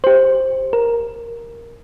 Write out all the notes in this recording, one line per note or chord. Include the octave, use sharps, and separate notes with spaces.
G4 C5
A#4